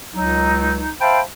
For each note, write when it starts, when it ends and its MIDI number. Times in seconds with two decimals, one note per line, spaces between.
0.14 0.90 37
0.14 0.90 54
0.14 0.90 63
1.01 1.20 72
1.01 1.20 76
1.01 1.20 77
1.01 1.20 79
1.01 1.20 81
1.01 1.20 83